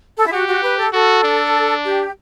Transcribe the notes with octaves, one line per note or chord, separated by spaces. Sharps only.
A4
E4
F#4 G4
F#4
B4
A4
F#4 A4
D4
G4